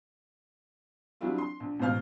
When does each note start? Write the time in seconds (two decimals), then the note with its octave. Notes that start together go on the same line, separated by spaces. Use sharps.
1.21 F#3 G3 C4 D4 E4 F4
1.38 C6
1.60 A#1
1.80 A1 G#2 B2 C5 F5 F6